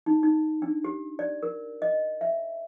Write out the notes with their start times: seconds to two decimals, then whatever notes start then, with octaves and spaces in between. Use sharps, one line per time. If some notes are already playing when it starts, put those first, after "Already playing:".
0.06 D#4
0.23 D#4
0.62 D4
0.84 G4
1.19 D5
1.43 A#4
1.82 D#5
2.21 E5